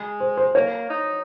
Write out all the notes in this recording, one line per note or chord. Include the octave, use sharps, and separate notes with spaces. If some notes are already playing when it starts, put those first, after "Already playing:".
Already playing: G#3
C5
C5
A#3 C#5
D#4